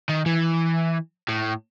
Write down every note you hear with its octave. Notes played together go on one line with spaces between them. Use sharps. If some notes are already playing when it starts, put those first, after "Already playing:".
D#3
E3
A2